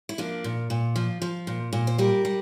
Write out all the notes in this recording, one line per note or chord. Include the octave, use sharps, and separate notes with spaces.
E4
F3 A#3 D4
A#2
A#2
F3
F3
A#2
A#2
C5
G3 G4 A#4
G3